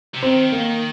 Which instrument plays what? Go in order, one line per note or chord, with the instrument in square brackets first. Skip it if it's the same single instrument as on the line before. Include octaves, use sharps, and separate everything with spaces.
[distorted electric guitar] C3
[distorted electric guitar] D#3 [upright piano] C4
[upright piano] A#3